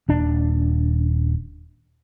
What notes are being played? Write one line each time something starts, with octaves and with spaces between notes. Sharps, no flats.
D#1 D4